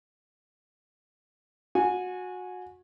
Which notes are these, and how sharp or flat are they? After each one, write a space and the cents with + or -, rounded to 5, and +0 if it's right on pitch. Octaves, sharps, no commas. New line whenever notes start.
F#4 -25 G#5 +0